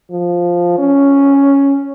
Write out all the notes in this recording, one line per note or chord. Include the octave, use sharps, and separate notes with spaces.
F3
C#4